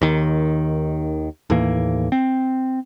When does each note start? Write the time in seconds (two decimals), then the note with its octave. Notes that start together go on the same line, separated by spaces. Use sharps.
0.01 D#2 D#3
1.50 D#2 A2 E3 A#3
2.12 C4